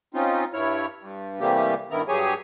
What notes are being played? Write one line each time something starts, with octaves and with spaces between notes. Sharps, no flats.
C4 C#4 D#4 F4
G2 E4 C#5 F6
G2
C3 E3 G3 A3 A#3 G4
G2 D#3 B3 E4 A#4 F6
G2 F#3 G4 G#4 C#5 G#5